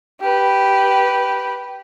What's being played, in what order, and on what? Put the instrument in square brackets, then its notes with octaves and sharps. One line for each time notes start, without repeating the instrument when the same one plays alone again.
[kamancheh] G4 B4